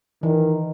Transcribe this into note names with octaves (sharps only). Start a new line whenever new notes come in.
D#3 E3